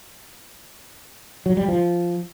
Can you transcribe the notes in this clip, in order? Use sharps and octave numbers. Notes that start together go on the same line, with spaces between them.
F#3
G3
F3